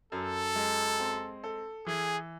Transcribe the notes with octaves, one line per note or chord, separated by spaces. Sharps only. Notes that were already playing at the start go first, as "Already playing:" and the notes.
F#2 A4
G#3
C4
A4
E3 G#4